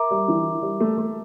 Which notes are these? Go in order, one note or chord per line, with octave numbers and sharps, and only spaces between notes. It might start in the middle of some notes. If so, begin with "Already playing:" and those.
Already playing: A#4 E5 A#5 D6
G3
E3
G3
A3
A3